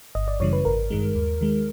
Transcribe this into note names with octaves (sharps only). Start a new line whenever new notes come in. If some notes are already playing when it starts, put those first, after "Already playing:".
G1 D#5
D5
F#2 C#3 E3 G3 C#5
B4
G#1 A#4
G2 D#3 G#3
D#2
D#3 G#3